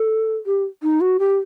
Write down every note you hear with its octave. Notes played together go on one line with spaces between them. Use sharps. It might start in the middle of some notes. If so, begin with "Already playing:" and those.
Already playing: A4
G4
D#4
F#4
G4